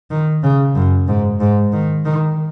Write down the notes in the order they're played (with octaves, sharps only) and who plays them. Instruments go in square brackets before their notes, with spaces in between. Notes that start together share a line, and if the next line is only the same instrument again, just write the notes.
[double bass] D#3
C#3
F#2
G#2
G#2
D#3
D#3